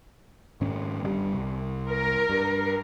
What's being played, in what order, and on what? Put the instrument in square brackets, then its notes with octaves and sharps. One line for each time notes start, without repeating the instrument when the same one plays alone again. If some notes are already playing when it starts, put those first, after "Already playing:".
[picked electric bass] G#2 D#3 C#4
G1 C#3 G3
C2
[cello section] A#4
[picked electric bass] G2